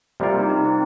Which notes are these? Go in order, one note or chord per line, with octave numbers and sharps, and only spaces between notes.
C3 G3 A#3 F4 A#4
G4
D#4
D#4
C4